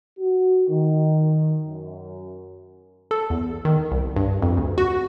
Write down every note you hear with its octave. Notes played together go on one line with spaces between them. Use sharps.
F#4
D#3
F#2
A4
E2
D#3
C2
G2
F2
D2
F#4